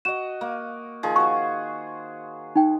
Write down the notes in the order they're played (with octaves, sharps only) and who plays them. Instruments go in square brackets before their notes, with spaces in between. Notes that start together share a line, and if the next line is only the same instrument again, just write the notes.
[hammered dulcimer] F#4 D#5 [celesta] E7
[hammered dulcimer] A#3
D#3 F3 G#4
[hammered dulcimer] F#4 C5 [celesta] C#6
[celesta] D#4 G5